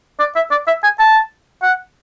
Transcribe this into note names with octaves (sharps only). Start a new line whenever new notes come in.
D5
E5
D5
E5
G#5
A5
F#5